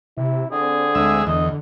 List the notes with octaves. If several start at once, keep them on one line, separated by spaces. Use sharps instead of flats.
C3 E4
D3 C4 G#4
D2 G#3 E5
E2 D3 D#5